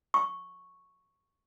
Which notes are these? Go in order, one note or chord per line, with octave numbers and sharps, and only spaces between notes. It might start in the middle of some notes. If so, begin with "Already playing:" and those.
C#6